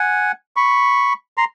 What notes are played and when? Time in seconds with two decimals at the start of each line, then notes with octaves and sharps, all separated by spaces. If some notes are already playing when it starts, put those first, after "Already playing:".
Already playing: F#5 G#5
0.56 B5 C#6
1.37 A#5 C6